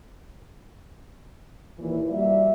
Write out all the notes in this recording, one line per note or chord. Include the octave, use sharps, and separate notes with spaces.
D#2 A#2 E3
F3 G3 A#3 F#4 D5 E5